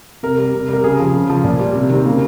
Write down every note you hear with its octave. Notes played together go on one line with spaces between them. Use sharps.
C3 A#4
G3
C3
G3 A#4
C#3 G#4
F3
C#3
F3
A#2
G3
C3
D#3 G3 C4
C#3 A#3